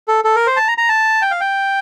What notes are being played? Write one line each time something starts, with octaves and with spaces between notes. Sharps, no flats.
A4
A4
A#4
C5
A5
A#5
A#5
A5
G5
F5
G5